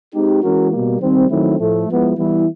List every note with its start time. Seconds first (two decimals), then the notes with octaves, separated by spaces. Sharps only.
0.14 G#3 C4 D#4 G4
0.43 E3 G#3 C#4 F#4 A#4
0.71 B2 G3 A#3
1.01 D#3 G3 C4
1.30 D#3 F#3 A3 C4 E4
1.59 A2 F3 A3
1.88 F3 G#3 B3 E4
2.17 E3 G3 B3 E4